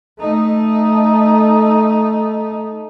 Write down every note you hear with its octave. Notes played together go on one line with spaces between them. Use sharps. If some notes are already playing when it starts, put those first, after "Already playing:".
A3 D#4